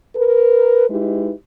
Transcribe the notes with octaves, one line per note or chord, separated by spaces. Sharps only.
A#4 B4
G#3 D#4 E4 G4 B4